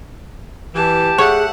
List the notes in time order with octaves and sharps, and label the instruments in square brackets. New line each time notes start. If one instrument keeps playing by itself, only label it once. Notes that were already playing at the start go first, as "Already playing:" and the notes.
[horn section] E3 [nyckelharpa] G4 A5
[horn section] A3 E5 F#5 [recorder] G#4 [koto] C#5